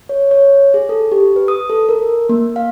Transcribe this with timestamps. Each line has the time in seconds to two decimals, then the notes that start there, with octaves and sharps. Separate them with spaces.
0.09 C#5
0.31 C#5
0.74 G#4
0.89 A4
1.12 G4
1.36 B4
1.48 D#6
1.70 A4
1.89 A#4
2.29 A#3
2.56 F5